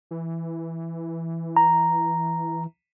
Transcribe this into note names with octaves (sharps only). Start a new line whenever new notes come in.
E3
A#5